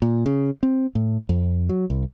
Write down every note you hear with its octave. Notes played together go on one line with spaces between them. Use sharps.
A#2
C#3
C4
A2
F2
F#3
C2